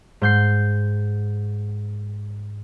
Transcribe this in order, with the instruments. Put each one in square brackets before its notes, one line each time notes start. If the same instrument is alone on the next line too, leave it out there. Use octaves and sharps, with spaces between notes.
[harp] G#2 G6 C7